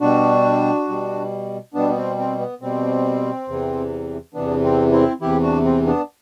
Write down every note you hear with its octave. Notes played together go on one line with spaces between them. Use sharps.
B2 G3 D4 F#4
B2 G3
B2 G3 B3 D4
B3
C4
C4
B3
B2 G3 C4
E2 C3 E3
E2 C3 E3 B3 D4
C4
C4 E4
E2 C3 E3 E4 G4
D4 F#4
C4
B3 D4